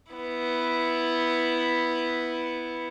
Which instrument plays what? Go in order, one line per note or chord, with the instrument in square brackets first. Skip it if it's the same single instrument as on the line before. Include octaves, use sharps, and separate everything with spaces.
[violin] B3 E4